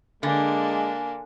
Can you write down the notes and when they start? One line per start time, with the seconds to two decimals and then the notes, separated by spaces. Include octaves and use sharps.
0.23 D3 G#3 A#3 D4 G#5